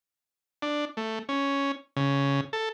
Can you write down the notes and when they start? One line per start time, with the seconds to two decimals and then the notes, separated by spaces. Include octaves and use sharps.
0.62 D4
0.97 A3
1.29 C#4
1.97 C#3
2.53 A4